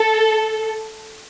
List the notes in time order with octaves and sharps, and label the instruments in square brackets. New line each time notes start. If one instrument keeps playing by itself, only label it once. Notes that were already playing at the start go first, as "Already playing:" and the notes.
Already playing: [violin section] A4